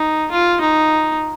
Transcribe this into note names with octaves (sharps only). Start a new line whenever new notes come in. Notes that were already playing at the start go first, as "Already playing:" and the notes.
Already playing: D#4
F4
D#4